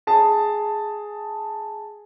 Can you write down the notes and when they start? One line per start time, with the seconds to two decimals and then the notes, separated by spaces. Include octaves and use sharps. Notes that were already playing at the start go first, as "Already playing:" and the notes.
0.07 G#4 A5